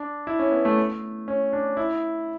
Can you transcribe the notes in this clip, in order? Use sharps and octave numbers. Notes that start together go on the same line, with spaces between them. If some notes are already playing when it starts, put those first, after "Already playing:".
Already playing: D4
E4
C#4
B3
A3
C#4
D4
E4